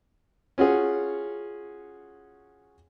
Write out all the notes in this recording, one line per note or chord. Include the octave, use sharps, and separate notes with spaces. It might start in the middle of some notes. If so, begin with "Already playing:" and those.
C#4 F4 F#4 G#4